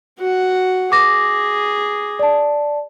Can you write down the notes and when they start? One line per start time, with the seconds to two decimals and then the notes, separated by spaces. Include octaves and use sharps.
0.19 F#4 F#5
0.92 G#4 D6 A#6
2.19 D5 A5